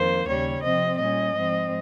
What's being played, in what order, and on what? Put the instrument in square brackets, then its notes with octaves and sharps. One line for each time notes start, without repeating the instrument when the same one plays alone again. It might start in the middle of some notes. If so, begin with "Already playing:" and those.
Already playing: [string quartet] F2 D#3 A#3 C5
D#2 C#3 G3 C#5
C3 F3 C4 D#5
A#2 G3 C#4 D#5
G#2 F3 C4